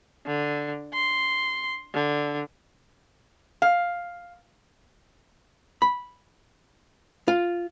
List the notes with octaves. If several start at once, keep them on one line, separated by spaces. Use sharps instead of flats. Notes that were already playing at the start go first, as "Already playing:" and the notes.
D3
C6
D3
F5
B5
F4